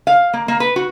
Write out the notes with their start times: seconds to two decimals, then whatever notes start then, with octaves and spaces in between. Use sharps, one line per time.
0.07 F5
0.33 A#3
0.48 A#3
0.60 B4
0.76 F#4